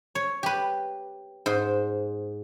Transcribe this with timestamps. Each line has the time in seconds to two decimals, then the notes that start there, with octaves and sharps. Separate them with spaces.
0.15 C#5
0.43 G4 B4
1.46 G#2 C5